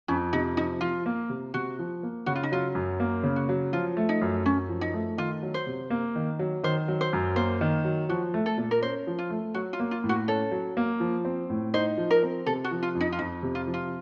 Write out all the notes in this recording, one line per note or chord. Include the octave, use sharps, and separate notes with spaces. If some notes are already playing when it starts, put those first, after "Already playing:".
F2 C#4
C3 D#4
F3 D#4
F3 F4
A#3
C3
C3 F#4
F3
A#3
C#3 F#4
F4
D#4
F#3 F4
F#2
A#3
C#3
F#4
F#3
F3 F4
A3
D#4
F#2
F#2 C#4
F3
D#4
A3
D#3 F4
F#3
C5
C3
A#3
D#3
F#3
D#3 C5
F#3
C5
F#2
A#3 C5
D#3
F#3
F3 F#4
A3
A4
A#2
A#4
C#4 C5
F3
F4
A3
F#3 F#4
F4
A#3
F4
A2
F#4
C#4 A4
F#3
A#3
F3
C4
A2
D#4 C5
F3
A#4
C4
C3 A4
F#4
F3
F4
F2
D#4
F4
F2 D#4
C3
F4
F3
F4